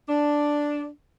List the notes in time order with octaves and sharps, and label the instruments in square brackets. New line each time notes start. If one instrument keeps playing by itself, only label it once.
[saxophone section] D4